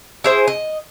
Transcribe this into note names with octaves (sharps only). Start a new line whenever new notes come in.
E4 G#4 C5
D#5